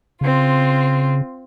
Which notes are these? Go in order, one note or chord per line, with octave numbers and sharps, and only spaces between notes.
C#3 C4 F4